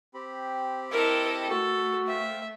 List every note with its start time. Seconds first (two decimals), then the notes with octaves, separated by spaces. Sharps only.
0.14 C4 G4 B5
0.91 E4 A4 A#4 D#5
1.49 A3 F#4 A4
2.07 C5 E5 F5 G5